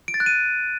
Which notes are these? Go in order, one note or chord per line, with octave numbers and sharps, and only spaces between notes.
D7
A6
F#6
D#7